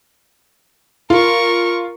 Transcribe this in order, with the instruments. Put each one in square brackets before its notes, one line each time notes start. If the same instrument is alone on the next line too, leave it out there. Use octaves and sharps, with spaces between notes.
[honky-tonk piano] F4 [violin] A#4 C#6